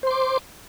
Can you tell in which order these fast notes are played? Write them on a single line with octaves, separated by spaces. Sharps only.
C5 C6 D6